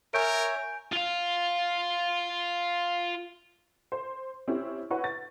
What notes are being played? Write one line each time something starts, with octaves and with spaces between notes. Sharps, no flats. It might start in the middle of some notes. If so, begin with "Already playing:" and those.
A#4 C#5 E5 G#5 G6 D7
F4 F5
C5
C4 C#4 E4 G4
E4 F#4 B4 C#5 F#5 C#6
A6